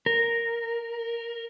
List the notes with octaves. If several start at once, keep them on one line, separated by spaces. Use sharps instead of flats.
A#4